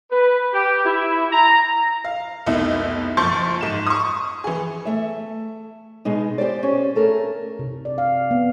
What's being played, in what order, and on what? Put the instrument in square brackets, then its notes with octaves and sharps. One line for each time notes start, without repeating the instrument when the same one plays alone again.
[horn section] B4
G4
E4
A#5
[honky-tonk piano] F5
F1 C2 B2 D#4 E4
F#1 F3 C6 C#6 G6 A6
G#2 E7
C#6 D#6
E3 G#4
[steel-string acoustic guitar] A3 E5
B2 G#3 D#4
G4 C5 D5
C#4
A3 A4 A#4
[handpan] C3
D5
F5
B3